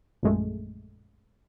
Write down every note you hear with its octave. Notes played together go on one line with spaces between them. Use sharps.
A#1 F#2 G#3 A3